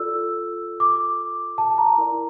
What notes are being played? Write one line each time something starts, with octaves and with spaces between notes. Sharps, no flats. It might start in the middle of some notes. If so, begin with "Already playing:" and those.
Already playing: F4 A4 D5 E6
D6
A5
A#5
E4 A#4 D5